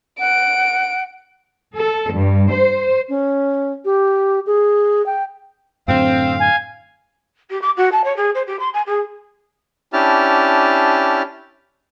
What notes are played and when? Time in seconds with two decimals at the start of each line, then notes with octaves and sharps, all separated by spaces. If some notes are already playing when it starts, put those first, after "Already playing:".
0.20 F#5 D7
1.74 A4
2.10 G2
2.50 C5
3.09 C#4
3.85 G4
4.47 G#4
5.06 G5
5.88 F#2 A2 D3 C4 F5
6.40 G#5
7.50 G4
7.61 D6
7.76 F#4
7.92 A5
8.04 C#5
8.16 G#4
8.34 C5
8.47 G4
8.59 C6
8.73 G#5
8.86 G#4
9.93 C#4 D4 E4 G4 A5 F6